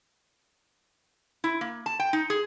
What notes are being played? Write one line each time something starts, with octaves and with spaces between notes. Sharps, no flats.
E4
A#3
A5
G5
D#4
G#4